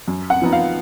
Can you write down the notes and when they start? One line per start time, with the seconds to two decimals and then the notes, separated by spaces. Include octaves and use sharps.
0.08 F#2
0.30 F#5
0.42 F3 B3 D#4
0.52 F5